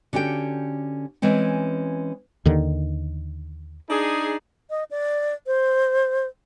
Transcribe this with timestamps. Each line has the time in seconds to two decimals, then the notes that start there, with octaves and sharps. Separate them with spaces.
0.13 D3 C#4 F#4 G4 G5
1.22 E3 G#3 C4 C#4
2.45 D#2 D3 D#3
3.90 D4 D#4 G#4
4.70 D#5
4.91 D5
5.47 C5